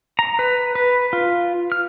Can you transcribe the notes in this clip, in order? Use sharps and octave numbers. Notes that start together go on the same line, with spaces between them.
A#5
B4
B4
F4
F6